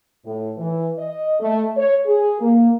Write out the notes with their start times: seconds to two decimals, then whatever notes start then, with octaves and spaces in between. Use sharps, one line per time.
0.25 A2
0.58 E3
0.98 D#5
1.40 A3
1.77 C#5
2.06 G#4
2.40 A#3